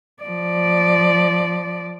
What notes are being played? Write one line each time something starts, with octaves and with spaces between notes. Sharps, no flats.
F3 D5